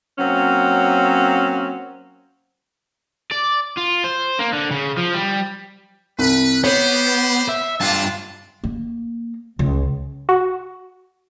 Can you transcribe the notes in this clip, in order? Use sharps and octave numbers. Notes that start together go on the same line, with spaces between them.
F#3 A#3 C4 C#4
D5
F4
C5
A#3
D3
C#3
F3
G3
C2 B4
B3 G4 C5 C#5
E5
G2 D4 F4 A5
A#3
C#2
F#4